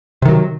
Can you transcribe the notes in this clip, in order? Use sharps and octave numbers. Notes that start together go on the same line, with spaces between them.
C3 D#3 F#3